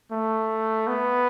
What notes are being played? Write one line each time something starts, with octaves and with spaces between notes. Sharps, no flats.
A3
B3